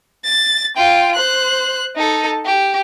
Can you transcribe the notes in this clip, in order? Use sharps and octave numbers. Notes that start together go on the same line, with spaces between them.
A6
F4 G5
C5 F#6
D#4 A4
G4